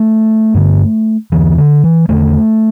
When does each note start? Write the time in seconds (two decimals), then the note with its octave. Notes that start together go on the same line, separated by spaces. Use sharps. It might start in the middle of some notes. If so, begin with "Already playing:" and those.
Already playing: A3
0.54 G2 D3
1.32 E2 D3 E3
1.58 D3
1.84 E3
2.09 E2 D3 A3